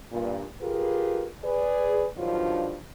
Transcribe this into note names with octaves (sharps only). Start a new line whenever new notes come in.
G2 A#2
F4 G4 G#4 A#4 B4
G#4 B4 D5
G2 D#3 F3 F#3 D4 F4